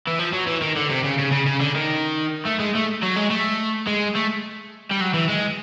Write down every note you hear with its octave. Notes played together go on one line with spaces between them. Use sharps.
E3
F3
F#3
E3
D#3
D3
C3
C#3
C#3
C#3
C#3
D3
D#3
A3
G#3
A3
F#3
G#3
A3
G#3
A3
G3
F#3
E3
G#3